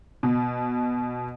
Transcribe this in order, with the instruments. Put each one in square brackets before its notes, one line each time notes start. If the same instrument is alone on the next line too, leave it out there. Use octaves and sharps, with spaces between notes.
[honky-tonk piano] B2